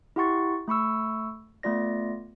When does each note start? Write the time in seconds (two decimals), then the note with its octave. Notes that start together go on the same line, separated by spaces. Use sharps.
0.16 E4 G4 F#5 C6 C#6 A6
0.68 A3 B5 C#6 E6
1.63 A3 B3 F4 D5 A#6